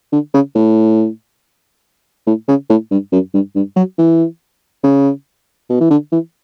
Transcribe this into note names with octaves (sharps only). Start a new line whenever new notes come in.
D3
C#3
A2
A2
C#3
A2
G2
F#2
G2
G2
F#3
E3
C#3
B2
E3
D3
E3